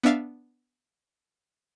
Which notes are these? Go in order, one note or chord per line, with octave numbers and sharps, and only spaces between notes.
B3 D4 E5 F5 A6